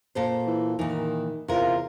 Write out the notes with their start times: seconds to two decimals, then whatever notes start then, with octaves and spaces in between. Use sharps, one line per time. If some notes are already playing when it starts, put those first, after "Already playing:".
0.15 A#2 A4 C5
0.47 E3
0.79 A#2 D#3 E3
1.48 E2 C3 F4 A#4